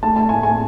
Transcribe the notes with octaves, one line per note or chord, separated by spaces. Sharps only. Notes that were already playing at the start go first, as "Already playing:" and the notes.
A3 A5
A5
A2 G#5
G#5